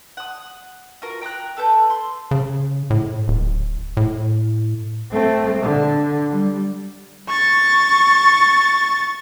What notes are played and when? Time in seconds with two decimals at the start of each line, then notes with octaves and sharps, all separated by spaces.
0.17 F#5 D#6
1.02 F4 F#4 A#4
1.21 G5 A#5 D6 F#6
1.57 A3 A4 B4 G6
1.90 C6
2.31 C#3
2.90 A2
3.28 D1
3.97 A2
5.12 A3 C4
5.61 D3
6.30 G3
7.29 C#6 A6